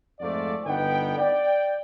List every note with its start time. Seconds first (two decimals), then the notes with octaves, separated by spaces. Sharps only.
0.20 F2 G#2 A3 F4 D5
0.66 G1 D3 B3 D#4 F#5 G5
1.17 D5 G5